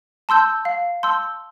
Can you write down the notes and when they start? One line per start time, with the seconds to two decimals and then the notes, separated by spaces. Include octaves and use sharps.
0.29 A5 C6 E6 G6
0.65 F5
1.03 A5 C6 E6 G6